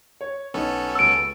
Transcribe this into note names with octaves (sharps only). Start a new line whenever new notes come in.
C#5
B1 F#3 B3 C#4 D#4 A4
C#2 B4 E6 D7